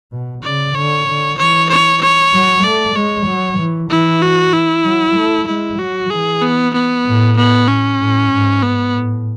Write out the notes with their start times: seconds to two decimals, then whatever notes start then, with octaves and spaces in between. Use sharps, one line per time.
0.12 B2
0.43 C#3 D5
0.75 D3 C#5
1.07 D3
1.38 E3 C#5
1.69 C#5
2.01 C#5
2.33 F#3
2.64 A3 D5
2.95 G#3 C#5
3.27 F#3
3.58 E3
3.90 E3 E4
4.22 F#4
4.53 E4
4.84 F#3
5.16 A3
5.47 G#3 E4
5.79 F#3 F#4
6.10 E3 G#4
6.41 B3
6.74 B3
7.05 A2
7.36 B3
7.67 C#4
8.00 A2
8.31 G#2
8.62 B3
8.94 A2